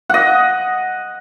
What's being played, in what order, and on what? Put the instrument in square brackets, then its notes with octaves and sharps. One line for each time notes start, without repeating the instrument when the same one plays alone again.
[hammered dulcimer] D#5 F#5